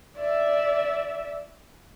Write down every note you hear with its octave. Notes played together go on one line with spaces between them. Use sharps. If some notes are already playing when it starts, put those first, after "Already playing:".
D5 E5